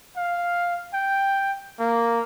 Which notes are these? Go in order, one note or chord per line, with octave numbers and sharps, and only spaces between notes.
F5
G5
A#3